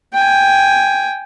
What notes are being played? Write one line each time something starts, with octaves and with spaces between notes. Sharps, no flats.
G5 G#5